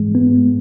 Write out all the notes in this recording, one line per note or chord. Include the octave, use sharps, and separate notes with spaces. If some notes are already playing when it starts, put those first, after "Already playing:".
Already playing: G#2 E3 G#3
B3